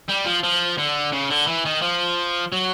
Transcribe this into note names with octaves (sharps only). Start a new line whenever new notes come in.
G3
F3
F3
D3
C#3
D3
E3
D#3
F3
F#3